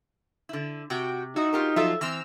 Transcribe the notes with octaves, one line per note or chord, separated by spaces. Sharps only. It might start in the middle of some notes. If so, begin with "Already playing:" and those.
D3 E4
C3 F#4 G5
D#4 E4 F#4
F4 G4 A#4
F3 F#3 F4 A4 E5
E3 C4 A#5 E6 F6